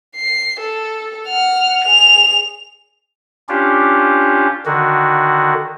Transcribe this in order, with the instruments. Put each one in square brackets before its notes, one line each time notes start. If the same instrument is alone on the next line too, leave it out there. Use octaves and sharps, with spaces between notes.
[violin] C7
A4
F#5 F6
G#4 F7
[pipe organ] C#4 D4 F4 G4
D3 D#3 F#4